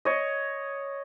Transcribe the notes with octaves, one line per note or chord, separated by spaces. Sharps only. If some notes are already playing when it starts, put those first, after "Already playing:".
C#5 D#5